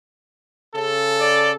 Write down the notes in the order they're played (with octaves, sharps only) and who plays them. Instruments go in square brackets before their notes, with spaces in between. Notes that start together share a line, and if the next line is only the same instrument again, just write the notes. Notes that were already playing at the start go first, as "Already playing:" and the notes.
[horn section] C#3 A4
[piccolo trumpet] D5